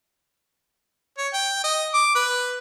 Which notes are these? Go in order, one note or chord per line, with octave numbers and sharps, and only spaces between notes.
C#5
G5
D#5
D6
B4